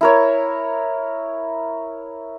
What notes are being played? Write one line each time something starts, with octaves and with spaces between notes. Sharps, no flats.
E4 A#4 C#5